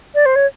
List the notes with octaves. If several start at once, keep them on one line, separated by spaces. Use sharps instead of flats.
D5
C5
C#5